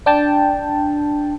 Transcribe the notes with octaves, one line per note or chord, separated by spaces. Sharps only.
D4 G5 A5